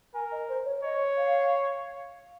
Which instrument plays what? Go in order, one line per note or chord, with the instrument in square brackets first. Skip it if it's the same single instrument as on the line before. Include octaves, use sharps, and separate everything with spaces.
[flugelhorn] A#4 [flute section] G#5
[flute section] D#5
C5
C#5
[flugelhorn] C#5 [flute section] D#5
[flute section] F5